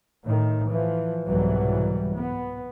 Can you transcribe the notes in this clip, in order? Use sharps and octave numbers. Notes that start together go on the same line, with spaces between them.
A2 D#3
E3 F3
C2 G#2 B2 E3 F#3 G3
B3